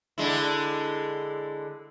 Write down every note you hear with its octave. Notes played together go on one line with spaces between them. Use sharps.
D3 G#3 E4